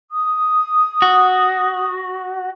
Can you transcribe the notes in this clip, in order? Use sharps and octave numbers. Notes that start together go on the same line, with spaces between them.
D#6
F#4